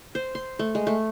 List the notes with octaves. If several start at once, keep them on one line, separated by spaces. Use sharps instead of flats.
C5
C6
A3
G#3
A3